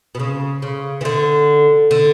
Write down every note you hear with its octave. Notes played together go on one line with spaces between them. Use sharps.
B2
C#3
C#3
E3
D3
D3